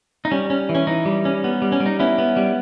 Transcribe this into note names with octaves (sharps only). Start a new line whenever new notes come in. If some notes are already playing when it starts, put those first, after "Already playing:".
D#4
G3 C#4
C#4
E3
C#4
E3 D#4
G3
C#4
B3
G3
C#4
G3
D#4
B3 C#4 E4
B3
G3